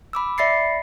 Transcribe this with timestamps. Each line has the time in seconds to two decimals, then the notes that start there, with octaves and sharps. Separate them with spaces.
0.13 B5 D6 E6
0.38 D5 E5 B5 A6 C7 C#7